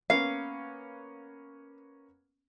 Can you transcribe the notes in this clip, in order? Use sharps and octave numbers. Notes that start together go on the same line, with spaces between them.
A#3 B3 C#4 F5